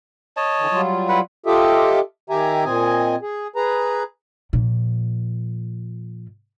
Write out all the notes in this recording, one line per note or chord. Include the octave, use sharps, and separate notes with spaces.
C#5 D#5 A5
D3 E3
F#3 G3 F4
E4 B4 F#5
F4 G4 A4 D#5 E5
D#3 G4 E5 G#5 A#5
A#2 C4 D#5 G#5
G#4
G#4 B4 A#5
A#2 F3